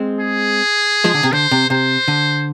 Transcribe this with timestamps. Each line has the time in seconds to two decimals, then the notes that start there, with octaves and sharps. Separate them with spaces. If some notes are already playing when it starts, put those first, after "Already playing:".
Already playing: G#3 C4
0.20 G#4
1.04 F3 G#3
1.14 D3
1.23 C3
1.33 D3 C5
1.51 C3
1.70 C3 C5
2.08 D3